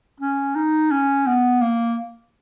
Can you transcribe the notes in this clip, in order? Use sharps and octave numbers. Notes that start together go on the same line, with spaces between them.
C#4
D#4
C#4
B3
A#3